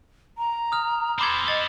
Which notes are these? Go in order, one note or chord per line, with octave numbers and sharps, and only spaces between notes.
A#5
D#6 F6
C4 A4 B5 C6 D6 G#6
D#5 A6